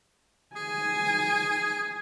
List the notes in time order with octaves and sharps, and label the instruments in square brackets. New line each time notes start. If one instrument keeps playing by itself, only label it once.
[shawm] G#4 [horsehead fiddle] G#5